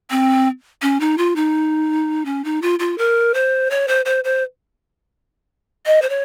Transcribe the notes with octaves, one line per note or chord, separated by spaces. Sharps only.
C4
C#4
D#4
F4
D#4
C#4
D#4
F4
F4
A#4
C5
C#5
C5
C5
C5
D#5
C5
C#5